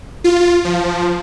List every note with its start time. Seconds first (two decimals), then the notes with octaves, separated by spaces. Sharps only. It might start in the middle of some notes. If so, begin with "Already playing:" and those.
0.24 F4
0.65 F3